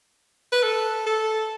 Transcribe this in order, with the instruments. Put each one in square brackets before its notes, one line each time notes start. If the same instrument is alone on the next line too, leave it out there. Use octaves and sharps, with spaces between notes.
[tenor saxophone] B4
A4
A4